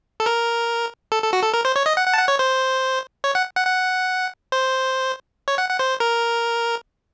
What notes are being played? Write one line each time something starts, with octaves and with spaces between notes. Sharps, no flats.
A4
A#4
A4
A4
F#4
A4
A#4
C5
C#5
D#5
F#5
F#5
A5
F#5
C#5
C5
C#5
F#5
F#5
F#5
C5
C#5
F#5
F#5
C5
A#4